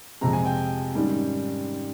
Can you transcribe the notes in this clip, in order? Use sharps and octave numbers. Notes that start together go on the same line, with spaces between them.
F2 C3 F3 G#3 C4 A#5
G#5
G5
G#2 D#3 G3 C#4